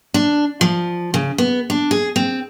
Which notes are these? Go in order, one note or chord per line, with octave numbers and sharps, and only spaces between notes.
D4
F3
C#3
B3
D4
G#4
C4